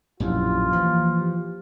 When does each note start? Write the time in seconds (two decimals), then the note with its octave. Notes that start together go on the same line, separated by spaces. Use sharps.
0.20 A#1 F#2 A2 E4 F4 G4
0.73 E3 F3 A#3
1.19 G4